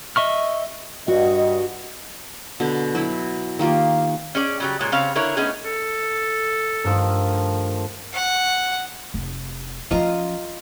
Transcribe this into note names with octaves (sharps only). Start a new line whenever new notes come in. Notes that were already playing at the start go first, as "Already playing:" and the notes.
D#5 E5 C#6 F6
G2 F#4 D#5
B2 D3
F#3 E4
D#3 A#3 F4 G4
C#4 G#4 D5
C#3 F#3 G3
A#2 G#3 C#5
C#3 G3 C4 C#5 F5
D3 E4 A#4 C#5
A3 B3 C#4 D#4 G#4
A4
G2 D#3 F3 A3 A#4 E6
F#5
F1
F3 C#4 F4 D#5 A#5